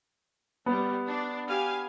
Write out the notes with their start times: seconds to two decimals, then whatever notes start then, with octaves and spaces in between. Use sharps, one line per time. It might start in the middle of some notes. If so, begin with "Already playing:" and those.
0.66 G3 B3
1.08 D4
1.46 G4 F5 G#5